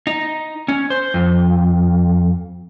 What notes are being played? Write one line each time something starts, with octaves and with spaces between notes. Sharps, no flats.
D#4
C#4
C5
F2